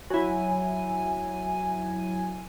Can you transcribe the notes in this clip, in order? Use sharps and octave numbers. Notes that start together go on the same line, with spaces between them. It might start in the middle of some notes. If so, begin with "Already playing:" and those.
F#3 E4 G#5